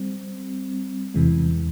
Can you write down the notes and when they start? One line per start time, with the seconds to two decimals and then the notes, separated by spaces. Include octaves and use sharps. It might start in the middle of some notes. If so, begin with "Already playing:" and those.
Already playing: G3 C4
1.14 E2 C3 E3 G#3